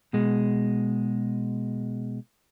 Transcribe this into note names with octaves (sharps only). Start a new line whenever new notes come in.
B2 G#3